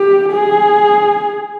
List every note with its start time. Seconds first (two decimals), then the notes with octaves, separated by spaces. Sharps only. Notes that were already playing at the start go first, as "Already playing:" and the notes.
Already playing: G4
0.32 G#4